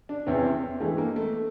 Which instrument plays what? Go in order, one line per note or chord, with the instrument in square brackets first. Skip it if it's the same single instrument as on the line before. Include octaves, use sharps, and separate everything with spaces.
[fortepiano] D4
E2 C3 E3 C#4
C4
G2 E3 G#3 A3
A#3
A3